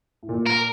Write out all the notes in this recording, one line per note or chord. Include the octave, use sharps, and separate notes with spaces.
A2
A#2
A#4